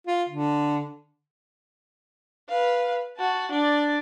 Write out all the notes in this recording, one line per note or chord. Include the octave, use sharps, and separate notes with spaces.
F4
D3
B4 F5
F#4 A5
D4 D5